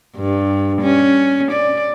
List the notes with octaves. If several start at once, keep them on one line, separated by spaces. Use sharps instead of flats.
G2
C#4
D5